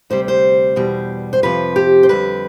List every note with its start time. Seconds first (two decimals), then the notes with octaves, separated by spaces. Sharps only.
0.10 D2 C3 G3 C5
0.28 C5
0.76 E2 B2 G3
1.33 C5
1.43 F2 C3 F3 B4
1.76 G4
2.03 C5
2.09 F2 D3 G3 B4